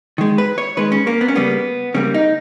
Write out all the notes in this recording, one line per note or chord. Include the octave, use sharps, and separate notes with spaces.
D#3 G#3
B4
C#5
D#3 G#3 B4
C#4
A#3
B3
C#4
C#3 G3 A#3 B3
C#3 G3 A#3 C#4
D#4